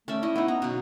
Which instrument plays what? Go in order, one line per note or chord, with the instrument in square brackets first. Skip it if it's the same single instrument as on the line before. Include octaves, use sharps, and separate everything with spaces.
[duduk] A3 [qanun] C#4 D5 E5
[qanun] E4 D#5
[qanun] B3 D#4 [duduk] E4
[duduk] B3 [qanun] A#5
[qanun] B2 F#3